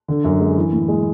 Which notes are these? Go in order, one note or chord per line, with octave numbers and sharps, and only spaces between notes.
D3
F#2
G#3
E3
A2
G#3